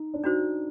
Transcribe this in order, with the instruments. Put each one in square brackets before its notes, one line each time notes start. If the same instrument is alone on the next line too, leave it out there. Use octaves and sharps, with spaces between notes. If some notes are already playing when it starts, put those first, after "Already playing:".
Already playing: [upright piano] D#4
D4
[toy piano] D4 F#4 C5 [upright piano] D#4